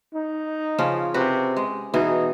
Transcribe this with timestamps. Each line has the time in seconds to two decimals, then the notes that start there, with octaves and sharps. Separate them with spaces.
0.14 D#4
0.79 C#3 F3 C#4
1.14 C3 F#4 B4
1.57 G#3
1.94 B2 E3 D#4 G#4